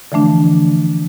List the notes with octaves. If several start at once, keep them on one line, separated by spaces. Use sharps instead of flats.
D3 E3 F3 A3 D4